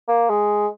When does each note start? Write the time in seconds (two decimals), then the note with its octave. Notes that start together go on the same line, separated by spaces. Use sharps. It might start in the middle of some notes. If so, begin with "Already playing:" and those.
0.08 A#3
0.30 G#3